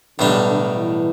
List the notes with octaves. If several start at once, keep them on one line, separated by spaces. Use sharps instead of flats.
B1 A2 D3 G3 D4
D3
E3